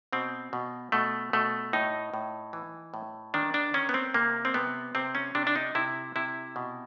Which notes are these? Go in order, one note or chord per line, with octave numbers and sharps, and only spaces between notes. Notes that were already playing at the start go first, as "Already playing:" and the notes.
B2 C4
B2
B2 A3
B2 A3
A2 D#4
A2
E3
A2
D#3 D4
D4
D#3 C#4
B3
C4
C3 A#3
C4
C3 B3
C3 C4
C#4
C3 D4
D4
D#4
C3 E4
C3 E4
B2